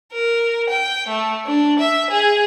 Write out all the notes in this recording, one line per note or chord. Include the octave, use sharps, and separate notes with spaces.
A#4
G5
A3
D4
E5
G#4